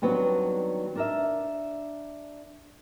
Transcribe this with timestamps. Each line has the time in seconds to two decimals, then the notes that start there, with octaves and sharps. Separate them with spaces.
0.02 D#3 F#3 G3 B3 C4 D4
0.95 D4 A#4 E5